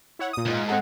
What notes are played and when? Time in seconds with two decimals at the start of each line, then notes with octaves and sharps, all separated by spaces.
0.19 E4 C#5 F#5
0.33 A#2 D#6
0.46 C#2 G#2 F4
0.68 C4 G#4 A4 F#5